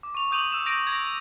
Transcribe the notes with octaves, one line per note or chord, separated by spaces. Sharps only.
D6
C#6 F7
D6 D#6 G6 D#7 F7 F#7
E6 E7 F7
D#6 G6 A#6 D7 D#7
G#6 A#6 D7